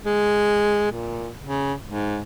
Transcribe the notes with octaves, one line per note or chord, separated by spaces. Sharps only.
G#3
A#2
C#3
G#2